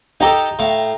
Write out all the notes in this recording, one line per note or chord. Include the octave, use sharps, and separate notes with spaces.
D#4 G4 A4 G5 A#5 D#6
A2 F5